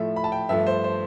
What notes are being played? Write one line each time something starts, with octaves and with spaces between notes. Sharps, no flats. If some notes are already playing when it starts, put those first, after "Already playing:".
Already playing: A2 F3 A3 E5
B5
A5
G5
G2 F3 A3 E5
C5
C5